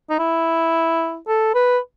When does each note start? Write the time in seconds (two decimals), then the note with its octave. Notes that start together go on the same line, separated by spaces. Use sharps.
0.10 D#4
0.19 E4
1.28 A4
1.55 B4